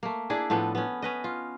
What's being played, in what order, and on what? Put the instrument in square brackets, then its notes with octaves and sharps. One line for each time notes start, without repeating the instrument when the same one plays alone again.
[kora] A3 A#3
D4 E4 G#4 D5
A2 F3 B3 A4
B3 C#4
C#4 B4 D#5
F4